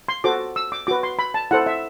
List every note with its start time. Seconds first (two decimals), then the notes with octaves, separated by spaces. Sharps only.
0.08 C6
0.24 F#4 A4 C5 D6
0.56 E6
0.72 D6
0.87 F#4 B4 D6
1.03 C6
1.19 B5
1.34 A5
1.51 E4 A4 C5 F#5
1.66 E5